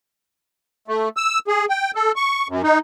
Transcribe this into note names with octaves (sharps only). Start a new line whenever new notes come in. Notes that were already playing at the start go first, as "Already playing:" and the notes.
A3
E6
G#4
G5
A4
C#6
F#2
D#4